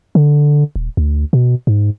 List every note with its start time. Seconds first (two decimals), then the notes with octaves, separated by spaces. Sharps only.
0.15 D3
0.76 D#1
0.97 D2
1.33 B2
1.67 G#2